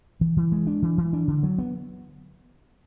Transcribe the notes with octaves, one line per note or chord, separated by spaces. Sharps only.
E3
E3
G#3
D4
E3
E3
D4
D3
F#3
B3